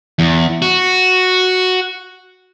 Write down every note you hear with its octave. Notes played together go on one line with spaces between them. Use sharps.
E2
F#4